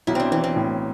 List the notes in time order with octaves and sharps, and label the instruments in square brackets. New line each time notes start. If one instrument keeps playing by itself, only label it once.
[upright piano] B1 [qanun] E4
[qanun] C4 D4
[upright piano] E3 [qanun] C4
[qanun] C4
[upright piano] A2